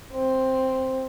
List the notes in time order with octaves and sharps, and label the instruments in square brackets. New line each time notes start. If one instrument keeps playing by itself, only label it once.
[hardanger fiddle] C4